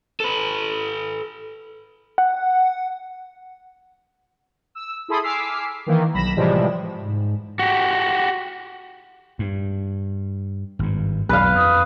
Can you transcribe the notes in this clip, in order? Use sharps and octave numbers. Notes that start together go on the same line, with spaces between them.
A4 B4
F#5
E6
E4 G#4 A4 B5 C6 D#6
G#5 D6 E6 F6 B6 C7
D#3 E3 A#3
B1 B5 A#6 E7
A2 C3 E3 F3 G3 G#3
G#2
F#4 G4
G2
G#1 G2
B1 F2 B4 F5
F2 D#6